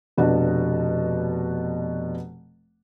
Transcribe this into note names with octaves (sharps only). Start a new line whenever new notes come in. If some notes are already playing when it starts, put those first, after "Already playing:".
F1 B2 D4 F#4